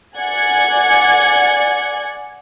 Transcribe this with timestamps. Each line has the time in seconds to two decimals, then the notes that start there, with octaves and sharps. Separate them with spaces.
0.18 D5 F#5 G#5 G#6 C#7